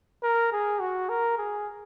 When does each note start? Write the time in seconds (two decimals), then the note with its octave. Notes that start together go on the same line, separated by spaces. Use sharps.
0.23 A#4
0.52 G#4
0.81 F#4
1.09 A#4
1.38 G#4